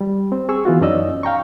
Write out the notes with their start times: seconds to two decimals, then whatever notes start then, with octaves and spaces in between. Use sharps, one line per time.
0.01 G3
0.32 C4
0.49 G#4 C#6 E6
0.65 E3 B3 F4 F#4
0.81 F#2 C#4 D#4 D5 D#5 E6
1.23 F5 G5 A#5 C#6